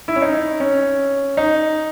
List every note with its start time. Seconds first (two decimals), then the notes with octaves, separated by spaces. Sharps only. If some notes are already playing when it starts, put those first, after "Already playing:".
0.08 E4
0.16 C#4
0.22 D#4
0.60 C#4
1.37 D#4